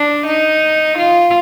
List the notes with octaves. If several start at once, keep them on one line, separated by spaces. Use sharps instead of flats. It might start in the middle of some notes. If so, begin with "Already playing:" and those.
Already playing: D4
D#4
F4